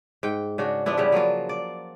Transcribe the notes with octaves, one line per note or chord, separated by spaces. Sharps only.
G#2 G5
C#3 D4 F#4
F3 B3 D4 E4
C#3 G3 E4
F3 F#3 A#3 F4
D5